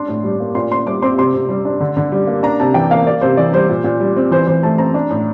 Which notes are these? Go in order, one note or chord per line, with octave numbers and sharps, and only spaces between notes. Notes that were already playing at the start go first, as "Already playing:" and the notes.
Already playing: D4 C6
A2
G3
A#3
A#2 C6
A#2 C6
G3 D6
C4 C6
C3 C6
C3
G3
D4
D3
D3
G3
A#3
D4 A#5
C3 A5
E3 G5
A#3 F5
A#3 D5
C3 C5
E3 D5
G3 C5
A#2
A#2
G3
C4
E3 C5
E3 C5
A3 A5
C4 A#5
D4
A2